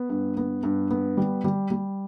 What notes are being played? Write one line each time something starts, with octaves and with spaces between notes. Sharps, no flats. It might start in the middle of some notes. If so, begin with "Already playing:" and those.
Already playing: B3
G2
B3
G2
B3
G3
G3
G3